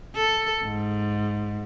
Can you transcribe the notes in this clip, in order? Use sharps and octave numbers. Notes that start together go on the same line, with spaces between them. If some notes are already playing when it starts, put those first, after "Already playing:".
A4
G#2